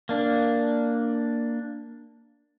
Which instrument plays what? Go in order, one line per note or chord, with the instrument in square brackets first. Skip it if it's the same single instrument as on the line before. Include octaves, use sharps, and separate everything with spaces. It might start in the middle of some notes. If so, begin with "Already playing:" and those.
[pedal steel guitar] A#3 D4